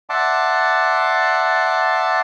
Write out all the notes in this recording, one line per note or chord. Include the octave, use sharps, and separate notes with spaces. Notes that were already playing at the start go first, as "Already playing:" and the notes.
D5 E5 F#5 A5 C6 D6